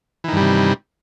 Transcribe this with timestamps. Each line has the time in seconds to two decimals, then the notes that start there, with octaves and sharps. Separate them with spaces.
0.24 E3
0.28 D#3
0.32 G2
0.37 G3
0.41 C3